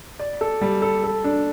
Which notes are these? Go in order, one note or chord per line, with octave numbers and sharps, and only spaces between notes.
D5
A4
G3
A4
A4
D4